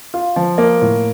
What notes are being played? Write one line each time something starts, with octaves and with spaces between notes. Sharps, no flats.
F4
F3
A#3
A2